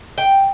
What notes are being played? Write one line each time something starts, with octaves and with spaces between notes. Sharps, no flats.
G5